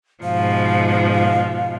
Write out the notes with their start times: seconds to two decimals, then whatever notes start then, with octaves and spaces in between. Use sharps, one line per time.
0.24 G#2 B2 F3 F5